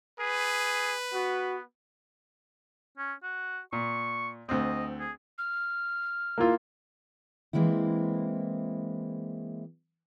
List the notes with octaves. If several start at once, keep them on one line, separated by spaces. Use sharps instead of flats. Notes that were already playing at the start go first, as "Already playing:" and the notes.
G#4 B4
B3 F#4
C#4
F#4
A#2 C#6
D2 C4 D#5
G#4
F6
A#3 E4 F4
E3 G#3 A#3 C4 E4